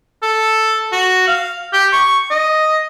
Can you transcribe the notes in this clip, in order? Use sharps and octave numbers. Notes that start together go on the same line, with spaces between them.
A4
F#4
F5
G4
C#6
D#5